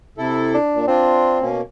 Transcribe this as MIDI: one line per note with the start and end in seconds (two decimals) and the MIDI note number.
0.18 0.56 48
0.18 0.56 64
0.18 0.56 69
0.55 0.84 62
0.74 0.85 46
0.88 1.46 60
0.88 1.39 62
0.88 1.39 65
1.41 1.61 47
1.41 1.61 58
1.41 1.61 61